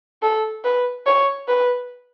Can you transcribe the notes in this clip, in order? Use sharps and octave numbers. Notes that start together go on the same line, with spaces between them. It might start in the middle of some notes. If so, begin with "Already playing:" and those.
A4
B4
C#5
B4